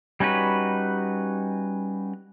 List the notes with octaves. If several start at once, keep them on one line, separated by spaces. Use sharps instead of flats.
G3 C#4 D#4 F#4 B4